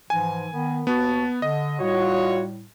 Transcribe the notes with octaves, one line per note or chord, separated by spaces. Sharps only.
G#2 E3 F3 G#5
D#3 B3
D#2 B3 F#4 A5
D3 D#5
A2 G3 F4 F#4 C#5